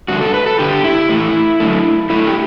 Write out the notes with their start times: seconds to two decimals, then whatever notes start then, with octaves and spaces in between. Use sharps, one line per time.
0.08 G2 D3 A3 F#4
0.21 A4
0.34 B4
0.46 A4
0.59 G2 D3 G3 G4
0.84 E4
1.09 A2 E3 A3
1.60 F#2 D3 A3
2.10 G2 D3 A3 E4
2.27 G4